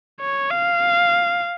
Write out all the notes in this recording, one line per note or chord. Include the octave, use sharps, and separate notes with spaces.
C#5
F5